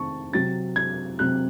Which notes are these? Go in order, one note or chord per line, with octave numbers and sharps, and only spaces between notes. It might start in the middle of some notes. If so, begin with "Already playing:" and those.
Already playing: C3 D#3 A3 C4 A5 C#6
C3 F#3 C4 A6
G#6
C3 F#3 C4 F#6